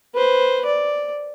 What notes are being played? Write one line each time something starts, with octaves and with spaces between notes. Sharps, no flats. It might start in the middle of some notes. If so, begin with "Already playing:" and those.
B4 C5
D5